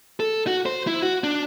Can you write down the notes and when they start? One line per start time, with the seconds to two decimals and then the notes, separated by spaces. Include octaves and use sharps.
0.20 A4
0.47 F#4
0.66 C5
0.87 E4
1.02 F#4
1.24 D4